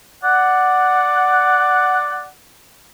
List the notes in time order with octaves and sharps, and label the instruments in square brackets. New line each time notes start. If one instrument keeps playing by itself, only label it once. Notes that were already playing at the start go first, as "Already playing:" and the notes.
[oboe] D5 [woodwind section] F#5